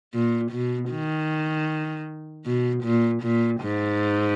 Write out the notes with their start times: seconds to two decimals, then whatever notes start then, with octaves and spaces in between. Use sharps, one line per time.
0.14 A#2
0.52 B2
0.90 D#3
2.46 B2
2.84 A#2
3.23 A#2
3.61 G#2